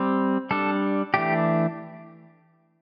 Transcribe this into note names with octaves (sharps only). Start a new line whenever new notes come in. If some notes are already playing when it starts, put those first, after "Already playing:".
Already playing: G3 C4
G3 D4 A4
E3 A3 D4 G4